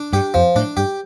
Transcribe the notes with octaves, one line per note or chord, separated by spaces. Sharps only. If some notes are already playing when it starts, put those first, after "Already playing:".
Already playing: D4
G2 G4
F2 F3
A2 D4
G2 G4